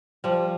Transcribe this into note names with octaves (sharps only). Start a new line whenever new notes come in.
F3 G3